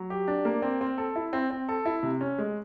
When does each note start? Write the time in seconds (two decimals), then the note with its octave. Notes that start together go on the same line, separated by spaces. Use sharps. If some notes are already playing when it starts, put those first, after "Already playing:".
Already playing: F#3
0.10 G4
0.28 D4
0.45 A#3
0.62 C4
0.81 C4
0.98 A4
1.16 E4
1.33 C4
1.50 C4
1.69 A4
1.85 E4
2.03 C3
2.21 C#4
2.38 G#3